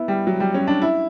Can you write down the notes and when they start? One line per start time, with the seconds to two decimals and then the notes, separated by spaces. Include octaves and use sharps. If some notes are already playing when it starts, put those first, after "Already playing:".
Already playing: B3 E4
0.08 G3
0.27 F#3
0.40 G3
0.54 C#4
0.67 D4
0.82 E4